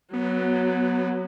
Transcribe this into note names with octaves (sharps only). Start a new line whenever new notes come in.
F#3 B3